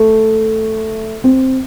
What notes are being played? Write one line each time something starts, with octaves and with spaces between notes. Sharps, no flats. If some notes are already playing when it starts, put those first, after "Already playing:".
Already playing: A3
C4